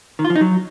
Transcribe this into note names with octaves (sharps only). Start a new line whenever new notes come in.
D#3
F4
F3
D#4
F#3